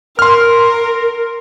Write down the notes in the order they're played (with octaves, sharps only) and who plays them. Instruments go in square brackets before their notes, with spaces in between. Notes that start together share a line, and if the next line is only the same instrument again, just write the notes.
[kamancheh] A#4 [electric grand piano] C6 F6